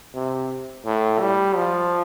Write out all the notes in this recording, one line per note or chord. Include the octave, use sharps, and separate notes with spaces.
C3
A2
G3
F3